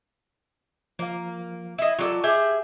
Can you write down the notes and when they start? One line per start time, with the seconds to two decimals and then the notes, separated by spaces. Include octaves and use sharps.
0.99 F3 A#3 F5
1.78 E4 D#5
1.99 F#3 F4 G4 A4 D5 D6
2.24 G4 G#4 E5 G#5 G6 G#6